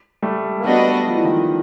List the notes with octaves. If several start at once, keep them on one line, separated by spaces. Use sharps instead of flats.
G3 A3
A#3
G3 A3 B3 D4 F#4 B4 D#5
F3
E3
D#3 F3